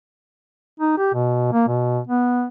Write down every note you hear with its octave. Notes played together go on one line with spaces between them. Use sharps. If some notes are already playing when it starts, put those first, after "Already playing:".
D#4
G4
B2
A#3
B2
B3